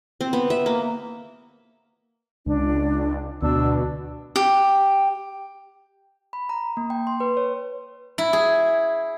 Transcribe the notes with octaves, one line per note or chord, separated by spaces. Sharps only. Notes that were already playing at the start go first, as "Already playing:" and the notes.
C4
B3
E5
A#3
C#2 D4
D2 B2 D4 E6
G4
B5
A#5
A#3
G5
C6
B4
C#5
E4
G#4